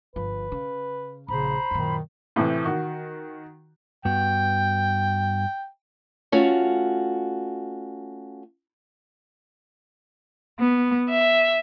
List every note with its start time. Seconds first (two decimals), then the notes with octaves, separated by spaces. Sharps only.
0.16 G1 F3 B4
0.52 C#3
1.28 A#1 C#3 C5 A#5 B5
1.71 F#2 A#2 D#3
2.36 A2 C3 E3
2.65 D#3 F#4
4.05 G2 B3 F#4 G5
6.32 A3 C#4 F4 F#4
10.58 B3
11.10 E5